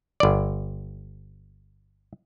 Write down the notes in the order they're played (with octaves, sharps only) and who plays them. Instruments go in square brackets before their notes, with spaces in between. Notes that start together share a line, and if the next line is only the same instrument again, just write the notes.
[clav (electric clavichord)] G1 D5